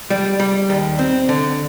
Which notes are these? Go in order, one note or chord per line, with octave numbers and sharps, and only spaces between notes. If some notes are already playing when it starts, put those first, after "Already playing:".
G3
G3
D#2
C4
D3